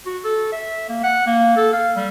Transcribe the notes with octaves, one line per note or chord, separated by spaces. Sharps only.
F#4
A4
E5
A#3
F#5
A#3
A4
F5
G3